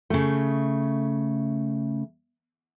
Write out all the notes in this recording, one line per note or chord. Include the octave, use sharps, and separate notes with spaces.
C#3 A3